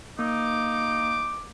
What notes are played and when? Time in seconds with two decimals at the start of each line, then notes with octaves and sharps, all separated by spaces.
0.19 A#3 D#4 D6